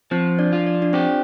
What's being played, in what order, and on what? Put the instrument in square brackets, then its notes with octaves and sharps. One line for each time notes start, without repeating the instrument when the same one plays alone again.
[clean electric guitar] F3 [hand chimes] C4 C5
[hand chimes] D4 D5
[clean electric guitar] F4
[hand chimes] D5
D4 D5
[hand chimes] C4 C5 [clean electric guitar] G4